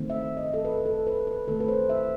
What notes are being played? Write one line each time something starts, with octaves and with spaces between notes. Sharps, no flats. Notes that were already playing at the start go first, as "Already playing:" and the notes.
Already playing: D#3 A3 C4
E5
D#5
A4
B4
A4
B4
B4
D#3 A3 C4 A4
B4
C5
E5